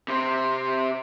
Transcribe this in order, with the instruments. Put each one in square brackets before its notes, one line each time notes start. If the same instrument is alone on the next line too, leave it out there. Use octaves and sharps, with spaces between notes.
[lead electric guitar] C3 C4